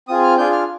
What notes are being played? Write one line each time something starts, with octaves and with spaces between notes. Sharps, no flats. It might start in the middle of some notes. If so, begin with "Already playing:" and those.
C4 F4 G#4 D#6
F6
D4 F4 G#4 G6
F6